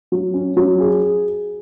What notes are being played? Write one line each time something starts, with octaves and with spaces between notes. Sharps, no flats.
F#3
C#4
F#3
G#4